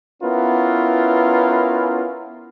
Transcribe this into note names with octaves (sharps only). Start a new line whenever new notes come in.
B3 C#4 E4 F4 A#4 B4